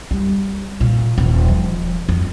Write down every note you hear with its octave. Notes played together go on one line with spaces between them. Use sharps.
G3
A#2
D#1
F3
F2